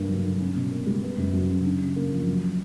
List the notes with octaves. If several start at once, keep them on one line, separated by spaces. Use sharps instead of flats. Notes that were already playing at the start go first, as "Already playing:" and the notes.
Already playing: G2 A#3
F#3
D3
C#4
B2
A#3
G3
B3
F#2
F#3
C#3
D4
C#3
A#3
F3
F#3